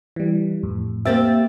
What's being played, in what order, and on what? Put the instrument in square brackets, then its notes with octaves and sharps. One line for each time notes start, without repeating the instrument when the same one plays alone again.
[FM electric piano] E3 G3
F2 A2
[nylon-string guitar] A#3 C4 G4 [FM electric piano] E5 A6